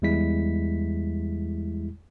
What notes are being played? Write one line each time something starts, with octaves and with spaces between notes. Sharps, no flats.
E2 G3 G#3 E4 B6